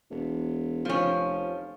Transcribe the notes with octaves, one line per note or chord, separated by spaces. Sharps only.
E1
F1 F3 C#4